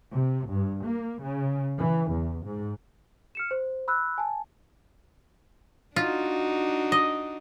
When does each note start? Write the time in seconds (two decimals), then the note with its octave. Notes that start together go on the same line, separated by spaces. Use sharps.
0.12 C3
0.49 G2
0.85 A#3
1.22 C#3
1.77 E3
2.10 E2
2.44 G#2
3.35 F6 C#7 E7
3.51 C5
3.88 B5 E6 F#6
4.18 G#5 A5
5.96 D4 D#4 F4 F#4
6.92 D#5